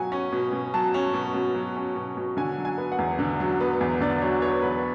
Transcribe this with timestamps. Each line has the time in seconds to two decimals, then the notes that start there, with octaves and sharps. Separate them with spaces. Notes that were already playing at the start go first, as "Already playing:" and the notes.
Already playing: B2 F#3 F#5 G#5
0.12 C#4
0.32 B2
0.53 B2
0.74 F#3 A5
0.94 C#4
1.14 B2
1.34 B2
1.55 F#3
1.76 C#4
1.96 B2
2.17 B2
2.37 D3 G#5
2.58 F#3
2.65 G#5
2.78 B3
2.92 F#5
2.98 E2
3.19 D3
3.40 F#3
3.61 B3
3.81 E2
4.00 D3 D5
4.21 F#3 C#5
4.42 B3 C#5
4.62 E2 B4